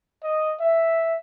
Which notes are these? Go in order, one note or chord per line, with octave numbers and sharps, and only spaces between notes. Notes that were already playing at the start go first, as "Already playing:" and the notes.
D#5
E5